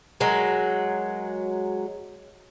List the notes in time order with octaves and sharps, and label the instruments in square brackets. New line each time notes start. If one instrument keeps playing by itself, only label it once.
[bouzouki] F#3 G#3 A#4